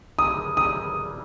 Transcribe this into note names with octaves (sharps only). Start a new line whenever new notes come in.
D#6
D#6